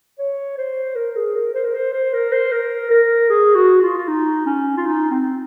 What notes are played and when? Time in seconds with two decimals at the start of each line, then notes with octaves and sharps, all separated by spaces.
0.19 C#5
0.58 C5
0.96 A#4
1.16 G#4
1.35 A#4
1.54 C5
1.64 A#4
1.74 C5
1.93 C5
2.13 A#4
2.32 C5
2.52 A#4
2.90 A#4
3.30 G#4
3.55 F#4
3.82 F4
3.97 F4
4.08 D#4
4.46 C#4
4.77 F4
4.86 D#4
5.11 C4